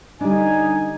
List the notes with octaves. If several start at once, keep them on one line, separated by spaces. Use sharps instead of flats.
D3 G3 D4 D#4 G#5